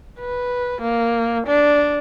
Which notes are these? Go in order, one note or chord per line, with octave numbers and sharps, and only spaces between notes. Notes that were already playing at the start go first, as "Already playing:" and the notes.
B4
A#3
D4